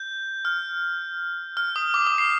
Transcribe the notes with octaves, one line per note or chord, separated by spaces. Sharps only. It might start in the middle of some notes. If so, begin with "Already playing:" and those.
Already playing: G6
F6
F6
D#6
D6
D#6
C7